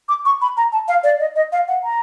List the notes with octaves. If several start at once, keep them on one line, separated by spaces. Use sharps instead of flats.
D6
C#6
B5
A#5
A5
F5
D5
D#5
D#5
F5
F#5
A#5